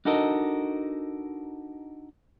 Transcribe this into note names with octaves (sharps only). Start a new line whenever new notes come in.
D4 D#4 F#4 A4 A#4 D#5